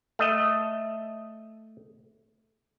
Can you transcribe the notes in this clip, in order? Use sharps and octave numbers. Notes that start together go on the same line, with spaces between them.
A3 D#5